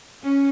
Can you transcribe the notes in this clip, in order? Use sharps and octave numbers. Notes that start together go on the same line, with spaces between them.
C#4